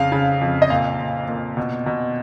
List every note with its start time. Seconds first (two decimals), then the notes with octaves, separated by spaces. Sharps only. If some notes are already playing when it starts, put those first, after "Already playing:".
Already playing: F2 C#3 F5
0.12 C#3
0.41 F2
0.62 D#5
0.70 A#2 F5
1.00 A#2
1.28 A#2
1.57 B2
1.86 B2